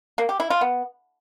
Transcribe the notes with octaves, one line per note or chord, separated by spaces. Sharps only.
A#3
G4
E4
F4
B3